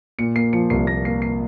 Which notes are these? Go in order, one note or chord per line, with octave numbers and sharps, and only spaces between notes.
A#2 C#7
A#3 C7
F3 C#7
C2 C7
A#3 A#6
A#3 C7
A#3 C7